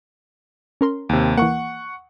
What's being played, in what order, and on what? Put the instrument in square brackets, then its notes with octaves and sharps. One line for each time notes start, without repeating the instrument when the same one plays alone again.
[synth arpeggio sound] C#4 A#4 C6
[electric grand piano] D#2 C3
[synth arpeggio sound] E3 A#3 [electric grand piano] F#5 C#6